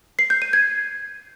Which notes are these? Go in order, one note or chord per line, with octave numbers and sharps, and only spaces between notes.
C7
G6
D#7
G#6